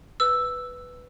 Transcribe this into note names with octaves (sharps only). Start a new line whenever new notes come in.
B4 E6